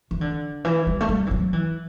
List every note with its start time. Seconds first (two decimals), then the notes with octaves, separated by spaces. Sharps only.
0.11 E3
0.21 D3
0.65 E3
0.87 G3
1.00 A3
1.09 G3
1.27 E3
1.31 F#3
1.53 E3